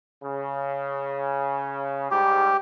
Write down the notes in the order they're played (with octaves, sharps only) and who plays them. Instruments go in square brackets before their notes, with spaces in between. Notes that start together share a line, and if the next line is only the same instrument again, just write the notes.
[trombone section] C#3
[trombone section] G#2 G3 [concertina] G4